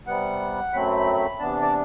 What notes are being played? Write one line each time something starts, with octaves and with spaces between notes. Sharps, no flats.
C3 G3 B3 F#5
F#2 F#3 A3 C4 B5
C3 E3 B3 D4 A5
D5